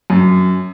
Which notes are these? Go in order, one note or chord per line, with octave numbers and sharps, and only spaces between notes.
F#2